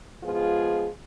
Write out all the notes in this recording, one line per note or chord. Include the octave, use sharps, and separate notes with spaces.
F3 G#3 B3 F4 G#4